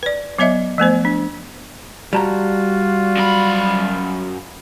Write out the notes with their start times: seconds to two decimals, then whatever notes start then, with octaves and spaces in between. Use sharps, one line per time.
0.03 B4 D5
0.39 F#3 B3 C#5 D#5 E5
0.78 F3 A3 B3 C5
1.05 D4
2.13 G3 F4 F#4 A5 A#5
3.16 F#2 B5